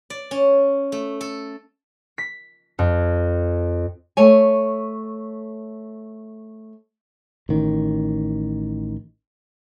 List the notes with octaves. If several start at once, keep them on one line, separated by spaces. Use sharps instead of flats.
D5
C#4
A3
A4
B6
F2
A3 C#5 G#5
A1 D#3